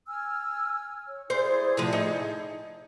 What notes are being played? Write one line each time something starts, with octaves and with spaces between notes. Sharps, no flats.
G#5 E6 F6
C#5
E4 G#4 C5 D5
A2 C3 F3
D#4